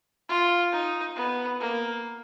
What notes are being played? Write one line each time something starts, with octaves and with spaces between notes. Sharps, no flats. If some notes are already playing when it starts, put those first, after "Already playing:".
F4
D#4
B3
A#3